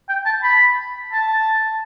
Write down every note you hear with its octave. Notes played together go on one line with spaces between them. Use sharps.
G5
A5
B5
A5